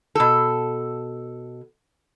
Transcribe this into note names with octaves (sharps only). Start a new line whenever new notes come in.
B2 A4